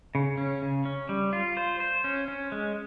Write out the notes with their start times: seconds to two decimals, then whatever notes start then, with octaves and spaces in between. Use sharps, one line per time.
0.15 C#3
0.38 C#4
0.62 C#3
0.85 C#4
1.09 G3
1.33 F4
1.57 C5
1.80 C5
2.04 C#4
2.28 C#4
2.52 G#3